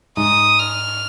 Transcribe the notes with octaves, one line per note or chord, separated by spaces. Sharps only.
G#2 D#6
F6